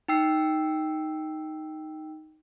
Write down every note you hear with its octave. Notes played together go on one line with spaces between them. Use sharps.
D#4 G5 E6 C7